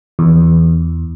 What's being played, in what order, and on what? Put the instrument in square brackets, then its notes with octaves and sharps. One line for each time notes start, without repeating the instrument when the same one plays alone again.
[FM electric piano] E2